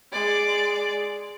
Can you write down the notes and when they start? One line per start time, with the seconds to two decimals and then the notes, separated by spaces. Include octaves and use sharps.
0.12 G#3 D5